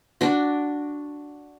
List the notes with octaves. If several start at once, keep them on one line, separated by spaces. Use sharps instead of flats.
D4 F#4